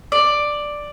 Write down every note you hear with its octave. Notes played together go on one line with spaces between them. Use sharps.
D5